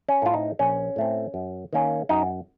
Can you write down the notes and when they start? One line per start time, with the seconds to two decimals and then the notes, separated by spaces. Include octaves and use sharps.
0.09 C#4
0.22 A2 A3 C4 F4
0.34 D#4
0.59 A#1 C#4
0.96 A2 A3 C4
1.34 F#2
1.73 D#3 A#3 C#4
2.09 F#2 D#4